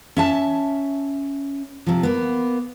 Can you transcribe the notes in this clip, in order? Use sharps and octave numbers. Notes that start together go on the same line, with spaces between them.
C#4 E5 A5
C3 F3
A#3 B3